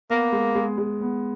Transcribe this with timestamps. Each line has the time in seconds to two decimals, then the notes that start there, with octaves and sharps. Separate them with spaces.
0.10 A#3 B3
0.32 G#3
0.55 G#3
0.78 G#3
1.01 B3